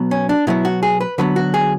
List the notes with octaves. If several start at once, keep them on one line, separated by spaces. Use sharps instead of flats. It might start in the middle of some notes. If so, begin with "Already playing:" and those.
Already playing: B2 F#3 B3
C#4
D4
B2 F#3 B3 E4
F#4
G#4
B4
D3 F#3 B3 B4
F#4
G#4